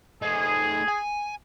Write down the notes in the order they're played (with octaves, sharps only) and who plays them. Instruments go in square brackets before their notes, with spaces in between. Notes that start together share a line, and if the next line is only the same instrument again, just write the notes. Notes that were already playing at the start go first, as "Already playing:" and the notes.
[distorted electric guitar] A3 D#4 [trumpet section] G#4
[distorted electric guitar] G#5